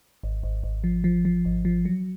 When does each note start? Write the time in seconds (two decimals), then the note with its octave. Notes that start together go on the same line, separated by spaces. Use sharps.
0.23 G#1
0.43 G#1
0.64 G#1
0.84 F3
1.04 F3
1.25 F3
1.45 G#1
1.65 F3
1.85 F#3